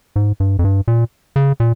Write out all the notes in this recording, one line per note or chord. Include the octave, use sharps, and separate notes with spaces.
G#2
G2
F2
G2
A#2
C#3
A#2